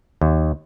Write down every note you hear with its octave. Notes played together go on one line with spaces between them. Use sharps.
D#2